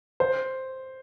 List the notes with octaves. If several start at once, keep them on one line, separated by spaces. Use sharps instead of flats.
C5